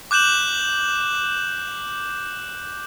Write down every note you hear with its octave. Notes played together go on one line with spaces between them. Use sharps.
D6 F#6 G6 E7 F#7